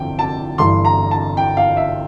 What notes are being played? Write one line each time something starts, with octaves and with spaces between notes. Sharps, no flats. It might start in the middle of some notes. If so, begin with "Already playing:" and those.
Already playing: G1 F2 G5
A5
G1 G2 E3 C6
A#5
A5
G5
F5
E5